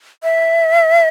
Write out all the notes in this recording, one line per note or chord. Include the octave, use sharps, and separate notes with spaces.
E5